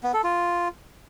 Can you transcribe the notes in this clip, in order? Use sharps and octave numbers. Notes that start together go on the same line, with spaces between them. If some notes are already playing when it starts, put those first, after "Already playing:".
B3
A4
F4